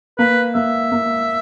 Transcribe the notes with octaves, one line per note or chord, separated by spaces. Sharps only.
A#3 B4
A#3 E5
A#3